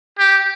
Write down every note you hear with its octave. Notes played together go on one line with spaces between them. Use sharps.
G4